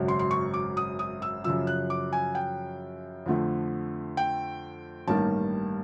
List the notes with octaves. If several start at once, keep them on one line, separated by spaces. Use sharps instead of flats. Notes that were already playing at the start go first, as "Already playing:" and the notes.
Already playing: G#1 F#2 C#3 F#3
C6
C6
C#6
D6
D#6
D#6
E6
F#2 C#3 F3 E6
F#6
D6
G#5
G5
F2 D3 F3 A3
G5
A1 G2 D#3 G3 A#3 A5